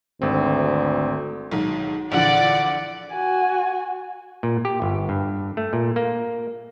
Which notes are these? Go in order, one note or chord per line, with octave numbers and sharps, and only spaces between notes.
G#1 D2 C4
B1 G#2 D#3
A#1 D3 E3 D5 F#5
F#4 G#5
A#2
G4
G1
G2
A3
A#2
A#3